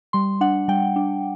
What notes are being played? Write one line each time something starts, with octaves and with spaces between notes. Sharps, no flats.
G3 C6
D4 F#5
G3 G5
D4